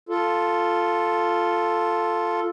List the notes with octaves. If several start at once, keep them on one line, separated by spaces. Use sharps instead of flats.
F4 A4